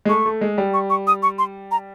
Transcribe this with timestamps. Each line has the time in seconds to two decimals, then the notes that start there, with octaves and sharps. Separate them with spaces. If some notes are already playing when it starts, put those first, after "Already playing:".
0.05 G#3
0.09 A3 C#6
0.26 A3
0.41 G#3
0.58 G3
0.74 C#6
0.90 C#6
1.07 D#6
1.23 C#6
1.39 C6
1.71 A#5